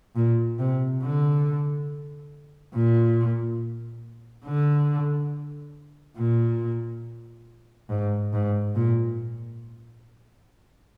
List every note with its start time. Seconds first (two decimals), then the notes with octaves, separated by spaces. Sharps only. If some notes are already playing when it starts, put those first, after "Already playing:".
0.16 A#2
0.59 C3
1.03 D3
2.74 A#2
4.45 D3
6.17 A#2
7.90 G#2
8.33 G#2
8.75 A#2